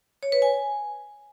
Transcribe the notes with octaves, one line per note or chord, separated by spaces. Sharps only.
C#5
B4
G#5